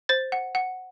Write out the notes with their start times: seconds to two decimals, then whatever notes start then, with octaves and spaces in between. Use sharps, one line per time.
0.09 C5 A6
0.32 F#5
0.55 F#5